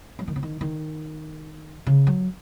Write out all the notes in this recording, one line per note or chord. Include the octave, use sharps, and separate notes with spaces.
F#3
D#3
C#3
D#3
D#3
C#3
F#3